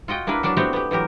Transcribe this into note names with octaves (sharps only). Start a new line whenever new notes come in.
F4 F#4 D#5 G5
A#3 D4 E4 A#4 B4
F#3 D4 D5 A5
A3 B3 C4 D4 F#4 G4
B3 G4
E3 F#3 G4 A#4